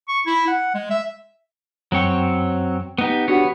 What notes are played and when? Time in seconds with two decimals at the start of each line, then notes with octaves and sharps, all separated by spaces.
0.08 C#6
0.26 E4
0.47 F#5
0.74 G#3
0.91 E5
1.92 F#2 F#3 C4 C#5 G5
2.98 B3 D#4 G4
3.28 B3 D4 F#4 G4 C#5